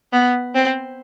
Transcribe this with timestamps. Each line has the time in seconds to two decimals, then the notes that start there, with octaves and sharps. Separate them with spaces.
0.12 B3
0.55 C4